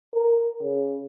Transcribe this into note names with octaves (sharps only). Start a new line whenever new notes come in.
A#4
C#3